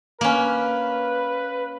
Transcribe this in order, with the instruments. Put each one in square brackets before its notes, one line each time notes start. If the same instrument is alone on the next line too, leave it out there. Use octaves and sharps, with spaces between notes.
[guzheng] A#3 C#4 [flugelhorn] B4